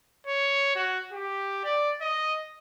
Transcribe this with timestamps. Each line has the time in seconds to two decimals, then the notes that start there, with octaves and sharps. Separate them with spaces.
0.27 C#5
0.75 F#4
1.12 G4
1.64 D5
2.01 D#5